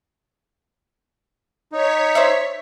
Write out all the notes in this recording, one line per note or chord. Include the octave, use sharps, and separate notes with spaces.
D#4 C#5 B6
C5 D5 E5